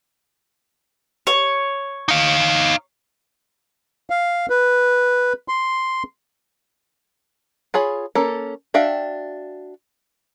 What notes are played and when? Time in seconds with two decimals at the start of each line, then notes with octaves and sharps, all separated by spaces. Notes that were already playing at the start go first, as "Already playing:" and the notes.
1.27 C#5
2.08 D#4 F5
4.10 F5
4.50 B4
5.48 C6
7.74 F4 G#4 C#5 B5
8.15 A#3 C#4 A4
8.74 D4 F#4 E5 F5 G5